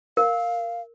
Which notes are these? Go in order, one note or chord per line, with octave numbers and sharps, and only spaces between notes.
A#4 F5